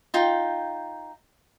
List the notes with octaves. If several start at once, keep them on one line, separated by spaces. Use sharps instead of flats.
D#4 F4 G5